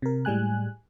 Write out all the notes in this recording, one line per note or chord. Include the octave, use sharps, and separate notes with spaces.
C3 A#4
A2 G3 G#3 G#5 F#6